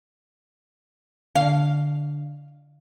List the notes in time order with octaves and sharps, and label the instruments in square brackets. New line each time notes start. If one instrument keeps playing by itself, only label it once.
[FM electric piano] D3 [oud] F5